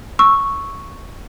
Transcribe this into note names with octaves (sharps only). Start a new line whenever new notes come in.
C#6 E6